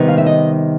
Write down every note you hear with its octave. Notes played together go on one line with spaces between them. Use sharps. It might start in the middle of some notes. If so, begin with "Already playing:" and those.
Already playing: C3 D#3 G3 B3
F5
E5
D#5